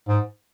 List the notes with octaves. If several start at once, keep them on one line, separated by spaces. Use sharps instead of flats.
G#2